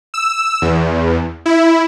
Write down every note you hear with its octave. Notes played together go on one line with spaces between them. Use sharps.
E6
E2
E4